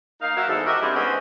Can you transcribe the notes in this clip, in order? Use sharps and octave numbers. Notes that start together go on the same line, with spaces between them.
A#3 D#4 F5
F#3 A#4 E5
E2 G#2 A4
D#4 F#4 G4 A#4 D#5 E5
G3 C4 D4 E4 G4 G#4
G#2 B3 C#4 A#4 C5 D#5